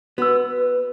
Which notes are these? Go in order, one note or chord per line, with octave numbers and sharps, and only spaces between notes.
B3 F#4 B4 E6